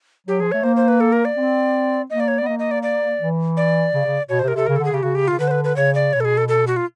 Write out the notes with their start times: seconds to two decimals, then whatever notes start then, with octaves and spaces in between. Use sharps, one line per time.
0.27 F#3 G4
0.40 F3 G#4
0.52 A3 C#5
0.63 A#3 C5
0.76 C5
0.88 B4
1.00 A4
1.12 A#4
1.25 D5
1.37 C4
2.10 A#3 D#5
2.20 D5
2.28 C#5
2.38 D5
2.42 B3
2.46 A#3 D#5
2.59 D#5
2.71 D5
2.83 D5
3.20 E3
3.57 D5
3.93 C#3
4.05 C#3
4.29 B2 C#5
4.39 C3 C5
4.48 A#4
4.54 C3 A4
4.67 C#3 A#4
4.76 D3 A4
4.85 G#4
4.90 C#3
4.94 G4
5.02 C#3 F#4
5.15 G4
5.28 C#3 F4
5.39 D3 B4
5.48 C5
5.51 B4
5.64 B4
5.75 C#3 C#5
5.95 D5
6.13 B2 C#5
6.20 A4
6.25 G#4
6.37 A4
6.48 A4
6.67 F#4
6.76 F4